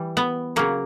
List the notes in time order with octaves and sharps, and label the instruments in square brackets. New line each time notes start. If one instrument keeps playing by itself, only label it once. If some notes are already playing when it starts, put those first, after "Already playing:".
Already playing: [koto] E3 G3
B3
C#3 F#3 A#3